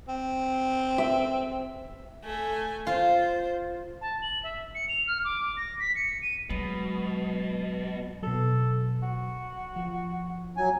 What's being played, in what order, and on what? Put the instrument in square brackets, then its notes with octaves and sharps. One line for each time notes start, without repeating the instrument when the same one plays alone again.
[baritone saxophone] C4
[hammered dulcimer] E5
[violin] A3 G#5
[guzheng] F4 [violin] C5
[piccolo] A5
F#7
E5
C#7
F7
F6
D6
A#6
B6
C#7
D#7
[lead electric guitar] B2 [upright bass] F#3 G#3
[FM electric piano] B2 F#3 [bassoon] A4
[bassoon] F#4
[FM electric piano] F3
[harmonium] F#3 G#5